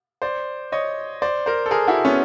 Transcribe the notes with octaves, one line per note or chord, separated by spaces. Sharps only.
C5 D5
C#5 D#5
C5 D5
A#4 C5
A4
G#4 A#4
E4 F#4
B3 C#4